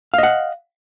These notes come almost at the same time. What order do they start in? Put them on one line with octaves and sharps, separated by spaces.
F5 D#5 F#5